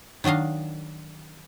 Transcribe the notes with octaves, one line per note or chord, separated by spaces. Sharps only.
D#3 F#3 D4 D#5 F5